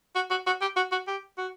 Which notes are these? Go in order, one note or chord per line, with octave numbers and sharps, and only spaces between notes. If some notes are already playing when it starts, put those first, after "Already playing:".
F#4
F#4
F#4
G4
F#4
F#4
G4
F#4